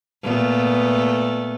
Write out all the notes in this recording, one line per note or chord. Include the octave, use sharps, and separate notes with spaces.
A#2 A3 B3